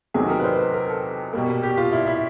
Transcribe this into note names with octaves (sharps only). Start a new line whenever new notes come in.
E2 C3 D#3 F#3 A3 G#4
A#4
B4
C5
B4
A#4
A4
B2 G3 A#3
G4
F4
E4
E4